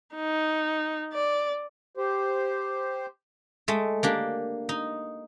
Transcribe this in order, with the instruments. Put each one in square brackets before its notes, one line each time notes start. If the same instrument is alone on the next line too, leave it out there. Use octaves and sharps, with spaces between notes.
[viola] D#4
D5
[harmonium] G4 C5
[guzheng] G#3 A3
A#3 D4 G4
D#4